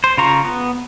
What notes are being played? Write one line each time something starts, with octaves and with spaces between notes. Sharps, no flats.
C5
C#3 F4 A#5 C#6
B3